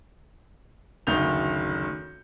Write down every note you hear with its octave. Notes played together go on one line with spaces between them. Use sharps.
F#1 D2 D#3 G6 F7